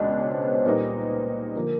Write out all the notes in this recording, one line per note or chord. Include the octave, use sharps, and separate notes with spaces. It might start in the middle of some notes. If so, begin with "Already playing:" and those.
Already playing: C#2 B2 G#3 B3 D4 D#5
C#5
C5
B4
C5
A#2 G3 A#3 D#4 B4
D3 F3 A#3 A#4